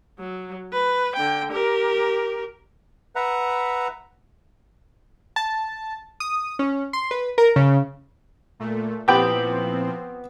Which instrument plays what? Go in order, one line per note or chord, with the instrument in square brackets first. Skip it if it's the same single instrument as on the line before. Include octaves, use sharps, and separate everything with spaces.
[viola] F#3
B4
D3 G5
G4 A#4
[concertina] B4 E5 F#5 A#5
[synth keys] A5
D#6
C#4
C6
B4
A#4
C#3
[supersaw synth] A#2 A3
[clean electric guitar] A#2 E4 B4 [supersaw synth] F3 C4 [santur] B3 [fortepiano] G4 G5